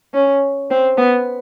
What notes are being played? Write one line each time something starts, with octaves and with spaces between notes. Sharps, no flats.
C#4
C4
B3